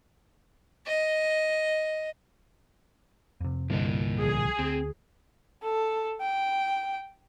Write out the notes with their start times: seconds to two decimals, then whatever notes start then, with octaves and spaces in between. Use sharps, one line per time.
0.87 D#5
3.40 F2 C3
3.70 C2 G2 A#2 D3 A#3 D#5
4.21 D1 D3 F3 G#4
4.59 D2 C4
5.63 A4
6.21 G5